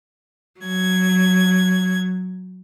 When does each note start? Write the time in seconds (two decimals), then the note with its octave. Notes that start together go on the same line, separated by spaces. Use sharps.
0.63 F#3 G#6